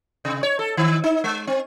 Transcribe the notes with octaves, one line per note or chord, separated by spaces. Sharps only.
C3
C#5
A4
D#3
D#4
G#3
C4